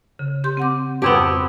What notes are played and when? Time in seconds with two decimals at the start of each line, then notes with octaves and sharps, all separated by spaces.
0.19 C#3
0.44 G4 C6 G6
0.57 C4 F#5 D6
1.02 F2 B3 C4 G4 A5